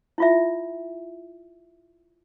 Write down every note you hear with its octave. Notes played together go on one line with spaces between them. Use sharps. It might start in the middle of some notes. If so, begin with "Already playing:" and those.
E4 F4 E5